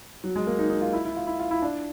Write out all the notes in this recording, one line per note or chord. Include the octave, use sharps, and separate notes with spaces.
F#3
G#3
A#3
D#4
D#4
F4
E4
E4
F4
E4
F4
E4
D4